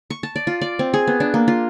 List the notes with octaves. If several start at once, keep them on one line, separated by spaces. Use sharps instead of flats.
C#6
A5
D5
F4
D5
C4
G#4
B3
D4
A#3
F4